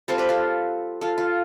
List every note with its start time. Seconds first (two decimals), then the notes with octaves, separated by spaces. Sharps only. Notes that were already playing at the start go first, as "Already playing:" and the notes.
0.08 G3 C4 F4 A4 C5
0.18 G4 B4
0.29 F4 A4
1.01 F4 A4
1.18 F4